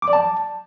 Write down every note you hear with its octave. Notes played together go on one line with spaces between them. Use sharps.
D6
D5
A5